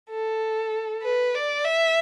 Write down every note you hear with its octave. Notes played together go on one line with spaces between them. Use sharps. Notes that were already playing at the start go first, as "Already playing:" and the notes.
A4
B4
D5
E5